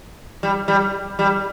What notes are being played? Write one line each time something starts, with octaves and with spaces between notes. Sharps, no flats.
G3
G3
G3